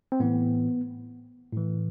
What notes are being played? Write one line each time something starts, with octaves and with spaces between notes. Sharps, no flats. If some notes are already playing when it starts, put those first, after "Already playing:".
C4
A2 E3 B3
A2 E3